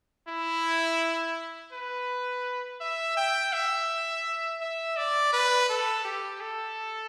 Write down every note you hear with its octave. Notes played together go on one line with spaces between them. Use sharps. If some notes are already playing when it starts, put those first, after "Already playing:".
E4
B4
E5
G5
E5
E5
D5
B4
A4
G4
A4